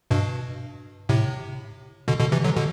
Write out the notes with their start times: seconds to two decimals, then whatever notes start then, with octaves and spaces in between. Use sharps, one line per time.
0.11 G2 B2
1.09 A2 C3
2.08 B2 D3
2.20 B2 D3
2.32 C3 E3
2.44 D3 F#3
2.56 B2 D3